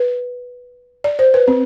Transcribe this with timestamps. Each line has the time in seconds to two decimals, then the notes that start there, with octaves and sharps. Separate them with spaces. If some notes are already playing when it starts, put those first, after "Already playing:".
Already playing: B4
1.04 D5
1.19 C5
1.34 B4
1.48 C4